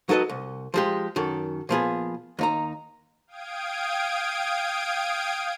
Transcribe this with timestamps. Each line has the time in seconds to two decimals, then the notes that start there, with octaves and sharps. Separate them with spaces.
0.09 F#3 D#4 A4 B4 D#5
0.29 C2
0.74 F3 G#3 G4
1.16 F#2 D#3 A4
1.69 A#2 F3 B3 G#4
2.39 D#2 D#4 A#5
3.27 F5 G5 D#6 G#6 D7